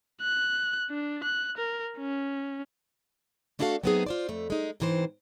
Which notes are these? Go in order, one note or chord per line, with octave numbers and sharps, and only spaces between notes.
F#6
D4
F#6
A#4
C#4
A3 D4 E4 F#4 A4 F5
F#3 A3 B3 C4 D#4 G#4
F4 C5 D5
F2 A3
G#3 D#4
G#2 C3 E3 G4 C5